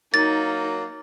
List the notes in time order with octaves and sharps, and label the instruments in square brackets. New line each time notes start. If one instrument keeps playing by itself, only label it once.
[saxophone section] F#3 A#3 [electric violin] D#4 [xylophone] A6